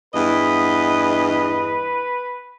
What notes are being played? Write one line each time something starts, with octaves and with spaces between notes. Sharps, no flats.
E2 G2 B4 D#5